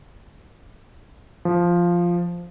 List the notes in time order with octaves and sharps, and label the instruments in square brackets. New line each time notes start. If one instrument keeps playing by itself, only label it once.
[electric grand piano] F3